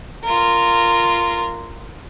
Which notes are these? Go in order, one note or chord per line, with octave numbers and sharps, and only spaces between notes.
F4 A#4